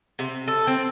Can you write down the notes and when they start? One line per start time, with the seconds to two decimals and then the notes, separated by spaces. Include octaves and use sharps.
0.19 C3
0.48 A4
0.67 C4